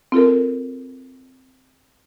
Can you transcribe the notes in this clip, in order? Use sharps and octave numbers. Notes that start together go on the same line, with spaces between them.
C4 F4 A4 A#4